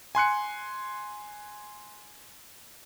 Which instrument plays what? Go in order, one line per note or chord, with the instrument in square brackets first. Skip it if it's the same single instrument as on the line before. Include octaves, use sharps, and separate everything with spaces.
[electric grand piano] G#5 C6 F#6 C#7